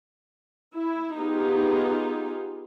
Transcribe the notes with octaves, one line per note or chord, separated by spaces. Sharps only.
E4
B3 D#4 F4 G4 G#4